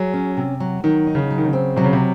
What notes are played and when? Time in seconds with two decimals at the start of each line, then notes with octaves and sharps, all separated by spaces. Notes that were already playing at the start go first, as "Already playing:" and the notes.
Already playing: F#3 G#4
0.13 C#4
0.37 C3
0.60 F#3
0.84 D#3 F#3
1.07 D#4
1.15 C#3
1.30 F#3
1.38 D#3
1.46 C#3
1.53 C4
1.76 C3 F#3
1.84 C#3
1.93 C3